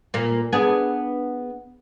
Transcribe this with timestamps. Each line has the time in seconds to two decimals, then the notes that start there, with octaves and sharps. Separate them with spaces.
0.14 A#2 A#3
0.53 B3 D4 G#4